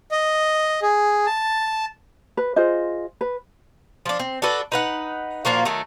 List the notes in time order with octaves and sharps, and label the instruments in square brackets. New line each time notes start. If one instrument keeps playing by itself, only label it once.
[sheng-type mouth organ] D#5
G#4
A5
[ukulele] B4
F4 G#4 C5 D#5
B4
[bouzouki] F3 D4
C4
D4 F#4 A4 B4
D#4 B4 F#5
A#2 F3 A#3 F#4
D#3 F#3 A3